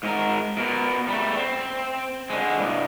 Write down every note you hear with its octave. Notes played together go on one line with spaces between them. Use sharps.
G#2 A#4
B2 A#4
G3 A3
C4
D3 G#3
C2 G2